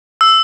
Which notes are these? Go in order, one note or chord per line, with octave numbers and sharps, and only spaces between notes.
E6